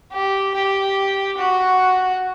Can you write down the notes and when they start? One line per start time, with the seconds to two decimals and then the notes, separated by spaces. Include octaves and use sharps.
0.13 G4
0.55 G4
1.38 F#4